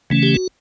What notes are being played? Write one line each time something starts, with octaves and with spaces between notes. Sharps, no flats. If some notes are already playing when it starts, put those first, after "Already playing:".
C#3 E3 A3 C#4
G4
F#4